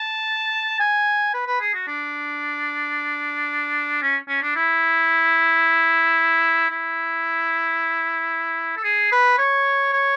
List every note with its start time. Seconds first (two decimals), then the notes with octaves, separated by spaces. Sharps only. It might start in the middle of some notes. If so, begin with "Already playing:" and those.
Already playing: A5
0.80 G#5
1.34 B4
1.47 B4
1.61 G#4
1.74 F#4
1.88 D4
4.02 C#4
4.28 C#4
4.43 D4
4.56 E4
6.70 E4
8.77 A4
8.84 G#4
9.12 B4
9.38 C#5
9.93 C#5